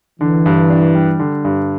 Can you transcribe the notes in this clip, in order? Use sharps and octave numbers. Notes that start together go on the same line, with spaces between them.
D3 E3
G2
D4
G3
D3
G2